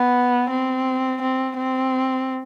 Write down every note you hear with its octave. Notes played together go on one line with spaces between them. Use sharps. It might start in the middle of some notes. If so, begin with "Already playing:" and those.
Already playing: B3
C4
C4
C4